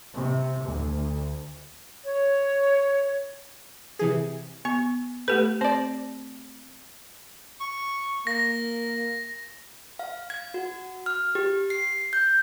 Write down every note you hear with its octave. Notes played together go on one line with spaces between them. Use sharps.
C3
D2
C#5
C3 E3 G#4
B3 C#6
A3 G4 A4 B4
C4 C5 D5
C#6
A#3 A#6
F5
G#6
F#4
F6
G4
C7
G6